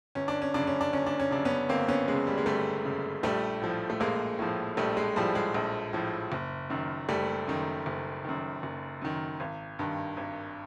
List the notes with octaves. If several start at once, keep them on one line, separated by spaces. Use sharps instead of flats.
G1 C#4
D4
C#4
F#2 C#3 D4
C#4
D4
G1 C#4
D4
C#4
F#2 C#3 D4
B3 C#4
G1 A#3 C4
B3 C#4
F#2 C#3 G#3
G3
G#3
G1 G3 A3
F#2 C#3
A#1 G3 A3
A2 F3
A3
A#1 G#3 A#3
A2 F3
A#1 G3 A3
G#3
A2 F3 G3
G#3
A#1
A2 F3
F#1
F#2 D#3
F#1 G3 A3
F#2 D#3
F#1
F#2 D#3
F#1
F#2 D#3
G#1
G2 D#3
G#1